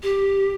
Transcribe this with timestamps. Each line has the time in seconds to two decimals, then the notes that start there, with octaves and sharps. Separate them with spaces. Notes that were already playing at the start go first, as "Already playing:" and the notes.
0.03 G4